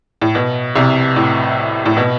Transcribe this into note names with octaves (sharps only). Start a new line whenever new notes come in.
A2
B2
C2 C3
A2
A2
B2